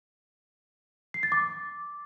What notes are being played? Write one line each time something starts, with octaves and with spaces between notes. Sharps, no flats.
C7
A6
D6